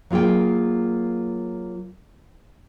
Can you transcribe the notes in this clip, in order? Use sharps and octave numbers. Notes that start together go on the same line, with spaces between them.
F#3 A#3 F4 G#4 G5